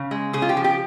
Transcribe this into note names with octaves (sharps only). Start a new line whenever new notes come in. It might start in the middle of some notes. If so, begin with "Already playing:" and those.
Already playing: C#3
G#3
C#3 G#4
F4
G4
F3
G4